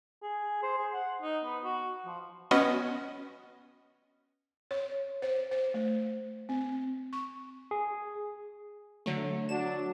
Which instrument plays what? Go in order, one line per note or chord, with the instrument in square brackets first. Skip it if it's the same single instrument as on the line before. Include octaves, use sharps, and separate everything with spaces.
[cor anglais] G#4
C5
G#4
F#5
D#4
B3
F#4
F3
[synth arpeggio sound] B3 C#4 F#4 B4 D#5 F#5
[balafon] C#5
C5
C5
A3
C4
C#6
[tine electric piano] G#4
[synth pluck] D3 F#3 A3
[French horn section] F#3 D4 [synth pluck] E7